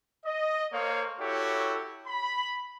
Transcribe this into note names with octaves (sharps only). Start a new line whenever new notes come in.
D#5
A#3 A4 C5 C#5 F5
E4 F#4 G4 A4 C#5
B5